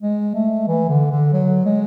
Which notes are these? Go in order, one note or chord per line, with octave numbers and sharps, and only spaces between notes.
G#3
A3
E3
D3
D3
F#3
G#3